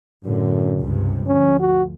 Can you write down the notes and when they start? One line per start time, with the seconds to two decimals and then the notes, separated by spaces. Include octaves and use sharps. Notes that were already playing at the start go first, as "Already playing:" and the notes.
0.25 F#2 A2 D3
0.80 C#2 G2 C3
1.27 D2 F3 C#4
1.60 F#4